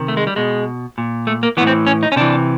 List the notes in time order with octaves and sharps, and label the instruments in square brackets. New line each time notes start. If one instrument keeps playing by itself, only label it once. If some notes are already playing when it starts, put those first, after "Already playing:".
Already playing: [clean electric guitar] C3 D#3
A3
G#3
G3
B2 G#3
A#2
A3
A#3
E3 B3
A2
C4
C#4
D#4
C#4
C3 E3 D4